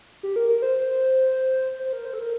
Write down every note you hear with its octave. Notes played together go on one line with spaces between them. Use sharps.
G4
A#4
A#4
C5
C5
A#4
C5
A4
A#4